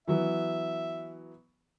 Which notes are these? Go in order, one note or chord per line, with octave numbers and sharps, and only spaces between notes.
E3 F#3 B3 E5